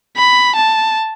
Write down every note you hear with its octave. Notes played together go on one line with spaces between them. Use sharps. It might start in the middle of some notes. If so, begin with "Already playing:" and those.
B5
A5